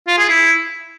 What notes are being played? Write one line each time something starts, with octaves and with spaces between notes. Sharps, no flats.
F4
G#4
E4